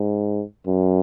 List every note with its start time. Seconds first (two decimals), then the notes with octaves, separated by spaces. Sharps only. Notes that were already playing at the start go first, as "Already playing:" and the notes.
Already playing: G#2
0.67 F#2